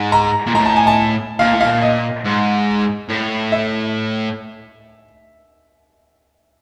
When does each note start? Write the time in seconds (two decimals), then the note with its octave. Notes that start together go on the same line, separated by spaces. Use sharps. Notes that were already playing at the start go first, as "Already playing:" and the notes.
Already playing: G#2
0.12 A#5
0.47 A#2
0.55 A2 A#5
0.65 A5
0.76 G#5
0.87 A5
1.39 A#2 F5
1.53 A2
1.60 F5
1.65 A#2
1.82 D#5
2.25 G#2
3.09 A2
3.52 E5